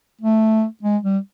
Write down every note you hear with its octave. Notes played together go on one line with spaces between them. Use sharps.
A3
G#3
G3